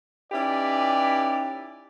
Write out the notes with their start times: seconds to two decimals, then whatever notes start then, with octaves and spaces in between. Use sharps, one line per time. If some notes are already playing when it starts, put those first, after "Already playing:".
0.32 C#4 D#4 E4 G4 B4 D5